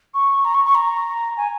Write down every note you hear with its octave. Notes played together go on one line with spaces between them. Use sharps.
C#6
A#5
C#6
C#6
A#5
G#5